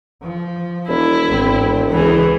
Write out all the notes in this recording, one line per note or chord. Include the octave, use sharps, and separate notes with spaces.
F3
E1 E4
G#1 C4
C#2 E3 E4 G#4